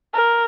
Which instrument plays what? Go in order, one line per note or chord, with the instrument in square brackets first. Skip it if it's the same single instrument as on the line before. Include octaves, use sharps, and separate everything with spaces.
[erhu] A#4